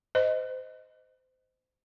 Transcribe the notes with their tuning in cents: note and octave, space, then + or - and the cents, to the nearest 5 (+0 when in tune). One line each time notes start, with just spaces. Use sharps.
C5 -25 D#5 +0